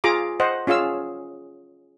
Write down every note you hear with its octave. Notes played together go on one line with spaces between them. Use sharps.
F4 G#4 A#5 D6
C5 D#5 F#5
C#4 F4 G#4 F5 E6